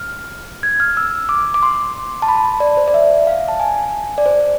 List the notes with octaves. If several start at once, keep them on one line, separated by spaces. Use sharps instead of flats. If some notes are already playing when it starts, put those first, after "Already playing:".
Already playing: F6
G#6
F6
E6
D6
D6
C6
A5
B5
D5
C5
D5
E5
F5
A5
G#5
D5
C5